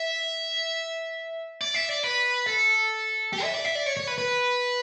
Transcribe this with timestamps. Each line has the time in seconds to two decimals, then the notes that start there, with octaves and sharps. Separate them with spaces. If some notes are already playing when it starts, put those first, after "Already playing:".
Already playing: E5
1.61 D5
1.75 E5
1.89 D5
2.04 B4
2.46 A4
3.33 G4
3.43 E5
3.54 D5
3.65 E5
3.75 D5
3.86 C#5
3.97 C#5
4.08 B4
4.18 B4